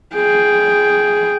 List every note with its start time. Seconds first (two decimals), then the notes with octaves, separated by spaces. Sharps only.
0.15 G#4 G5